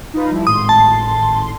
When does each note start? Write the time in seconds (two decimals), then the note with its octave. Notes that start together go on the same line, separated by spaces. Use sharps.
0.13 D#4 F4 B4
0.31 F3 G3 E4
0.47 G#1 A2 C6 D#6
0.69 A5